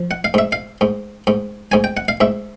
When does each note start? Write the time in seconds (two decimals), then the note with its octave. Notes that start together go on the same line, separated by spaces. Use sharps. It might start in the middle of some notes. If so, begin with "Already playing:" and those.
Already playing: F3
0.11 F#5
0.24 F5
0.34 G#2 E5
0.52 F5
0.81 G#2
1.27 G#2
1.72 G#2 G#5
1.84 G5
1.97 F#5
2.08 F5
2.21 G#2 E5